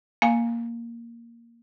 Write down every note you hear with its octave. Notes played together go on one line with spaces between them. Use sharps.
A#3 F5 G#5